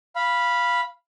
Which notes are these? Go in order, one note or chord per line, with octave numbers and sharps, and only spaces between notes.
F5 B5